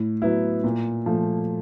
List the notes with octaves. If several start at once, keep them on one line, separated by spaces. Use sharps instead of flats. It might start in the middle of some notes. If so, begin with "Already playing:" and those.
Already playing: A2
F#3 B3 E4
A#2
F3 A3